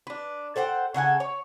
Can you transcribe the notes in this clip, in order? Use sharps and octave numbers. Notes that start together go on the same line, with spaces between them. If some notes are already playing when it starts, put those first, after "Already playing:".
D4 B4
A4 C5 F#5 G5
C#3 A4 F#5 G#5
C#5